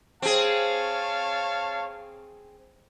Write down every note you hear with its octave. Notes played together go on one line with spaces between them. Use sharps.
C4 G#4 C#5 F5 A5